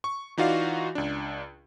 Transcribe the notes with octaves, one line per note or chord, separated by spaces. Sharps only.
C#6
E3 D#4 F4 F#4 D5 F5
C#2 D4